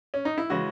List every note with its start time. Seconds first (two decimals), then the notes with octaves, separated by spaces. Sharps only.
0.14 C#4
0.25 D#4
0.38 E4
0.50 C#3 E3 G#3 F#4